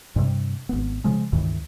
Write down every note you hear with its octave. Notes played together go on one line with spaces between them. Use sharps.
G2 C3 G3
G#1 B3
C#3 F3 G#3
C#2 G2 D#3 E3